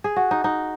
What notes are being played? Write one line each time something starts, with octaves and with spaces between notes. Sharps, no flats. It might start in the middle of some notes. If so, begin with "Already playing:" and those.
G#4
F#4
D#4
D#4